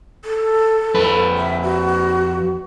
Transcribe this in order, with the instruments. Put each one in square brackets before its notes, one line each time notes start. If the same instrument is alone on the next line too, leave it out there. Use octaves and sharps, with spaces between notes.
[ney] A4
[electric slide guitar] F2 B4
[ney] E5
F#4